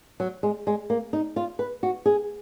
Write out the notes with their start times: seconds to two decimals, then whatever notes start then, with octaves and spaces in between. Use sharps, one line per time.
0.20 F#3
0.43 G#3
0.67 G#3
0.90 A#3
1.13 D#4
1.36 F4
1.59 B4
1.83 F#4
2.06 G#4